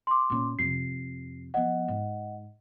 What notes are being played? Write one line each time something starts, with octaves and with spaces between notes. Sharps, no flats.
C6 D6
A#2 C#4
F2 C3 C7
F3 B3 D#5 F#5
G#2